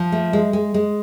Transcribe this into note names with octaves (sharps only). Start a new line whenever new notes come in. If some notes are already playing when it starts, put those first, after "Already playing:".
Already playing: F3
A3
G#3
G#3
G#3